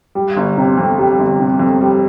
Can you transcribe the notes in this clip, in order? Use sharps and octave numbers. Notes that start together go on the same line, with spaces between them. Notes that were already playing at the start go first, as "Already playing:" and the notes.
G3
G1
C3
F2
G3
G1
C3
F2
G3